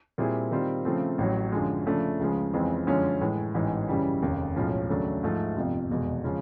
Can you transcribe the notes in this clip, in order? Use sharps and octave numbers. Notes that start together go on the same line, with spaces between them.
A#2 G3 C4 E4 G#4
D#3 G3 C4 F4
C#3 F3 A3 C4
A1 A2 F#3
F#2 D3 F3 G#3
C#3 F3 A3 D4
C#2 C#3 F3 G#3
F2 C#3 E3 G#3 C4
F#2 D3 F3 G#3 C#4
A2 E3 G#3
A1 G#2 E3 G#3
F#2 C#3 E3 G3
F1 D#2 C#3
B1 A2 F3 G#3 C#4
D#2 C#3 F#3 A3 D4
G#2 F3 A3
G1 F2 C3 F3
F1 E2 B2 G#3
C#3 F3 G#3 C#4